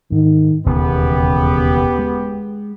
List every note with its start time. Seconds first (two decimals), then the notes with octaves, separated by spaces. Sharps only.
0.12 G#2 D#3
0.66 E1 D#2 C#3 E3 B3 G4
1.99 G#3